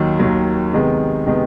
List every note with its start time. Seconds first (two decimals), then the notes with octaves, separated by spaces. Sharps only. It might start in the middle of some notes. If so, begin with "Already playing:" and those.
Already playing: D#2 D#3 F#3
0.19 D#2 D#3 F#3
0.72 C3 D#3 G#3 B3
1.26 C3 D#3 G#3 B3